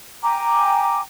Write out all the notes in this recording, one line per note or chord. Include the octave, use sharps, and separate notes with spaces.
G5 G#5 A#5 D6